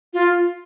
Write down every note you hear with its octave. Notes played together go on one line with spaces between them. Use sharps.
F4